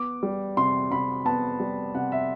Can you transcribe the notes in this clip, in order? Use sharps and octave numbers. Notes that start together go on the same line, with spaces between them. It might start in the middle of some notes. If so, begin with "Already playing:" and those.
Already playing: B3 D6
G3
C3 C6
C3 B5
B3 A5
G3
C3 F#5
E5